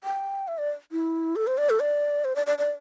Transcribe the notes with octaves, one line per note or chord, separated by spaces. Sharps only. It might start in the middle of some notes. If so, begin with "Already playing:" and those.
G5
E5
D5
E4
A4
C5
D5
A4
D5
C5
D5
D5
D5